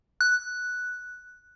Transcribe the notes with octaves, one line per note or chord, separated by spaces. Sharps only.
F#6